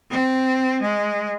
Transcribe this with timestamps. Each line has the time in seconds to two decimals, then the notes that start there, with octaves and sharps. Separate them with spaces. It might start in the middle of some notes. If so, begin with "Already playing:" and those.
0.10 C4
0.82 G#3